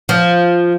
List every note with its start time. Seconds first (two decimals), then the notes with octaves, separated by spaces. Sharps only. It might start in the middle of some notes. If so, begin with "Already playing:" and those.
0.09 F3